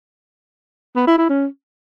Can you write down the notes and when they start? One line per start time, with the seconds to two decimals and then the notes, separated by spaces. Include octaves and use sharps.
0.96 B3
1.07 E4
1.18 E4
1.29 C#4